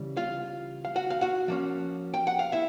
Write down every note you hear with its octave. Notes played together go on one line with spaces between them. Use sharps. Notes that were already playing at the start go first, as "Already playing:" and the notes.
Already playing: C#3 E3 G3
F4 F5
F5
F#4 F#5
F5
F#4 F#5
F3 A#3 C#4
G5
F#5
F5
E4 E5